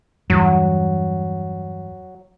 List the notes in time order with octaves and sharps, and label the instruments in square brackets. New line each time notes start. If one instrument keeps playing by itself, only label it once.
[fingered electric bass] E2 G2 [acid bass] F#3